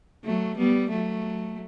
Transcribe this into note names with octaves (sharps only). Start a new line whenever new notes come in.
F#3 A3
G3 B3
F#3 A3